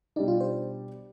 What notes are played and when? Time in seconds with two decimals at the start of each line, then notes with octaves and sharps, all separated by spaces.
0.16 B2 G3 D4 D#4 G4 D5
0.28 F4
0.40 C5